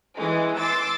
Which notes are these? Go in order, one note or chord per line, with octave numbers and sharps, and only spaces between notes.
E3 G#3
C6 D6 E6 A6